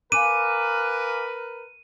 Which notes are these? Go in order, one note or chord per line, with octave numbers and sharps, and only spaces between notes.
A#4 B4 F5 G#5 D6 D#7